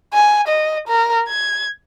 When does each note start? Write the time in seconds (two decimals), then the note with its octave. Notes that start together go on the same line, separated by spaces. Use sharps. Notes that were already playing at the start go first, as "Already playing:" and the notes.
0.13 G#5
0.48 D#5
0.88 A#4
1.28 G#6